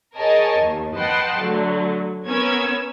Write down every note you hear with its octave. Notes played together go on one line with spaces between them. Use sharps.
G#4 A#4 C#5 D#5 G#5 A5
D#2
B4 D#5 F#5 G5 A5 C6
D3 F#3 A3
B3 C#4 A#4 E6 G#6